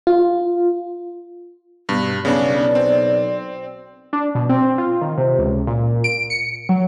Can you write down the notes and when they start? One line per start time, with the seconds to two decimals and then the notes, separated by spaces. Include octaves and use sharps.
0.07 F4
1.89 G2 B2
2.25 B1 C#3 B3 D4 D5
2.75 C4
4.13 D4
4.35 B2
4.49 C4
4.78 F4
5.01 D#3
5.18 C3
5.39 C#2
5.67 A#2
6.04 D7
6.30 C#7
6.69 F#3